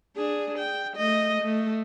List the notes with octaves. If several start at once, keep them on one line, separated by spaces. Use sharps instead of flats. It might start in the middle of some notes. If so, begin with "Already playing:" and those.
D4 G#4
G5
A3 D#5
A3